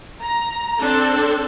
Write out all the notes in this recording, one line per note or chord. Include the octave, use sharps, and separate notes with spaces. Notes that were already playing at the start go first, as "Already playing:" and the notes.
A#5
C4 D4 A4